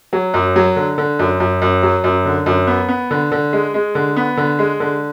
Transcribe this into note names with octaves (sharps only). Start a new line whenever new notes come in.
F#3
F#2
F#3
D3
D3
F#2
F#2
F#2
F#3
F#2
D3
F#2
B3
B3
D3
D3
G#3
G#3
D3
B3
D3
G#3
D3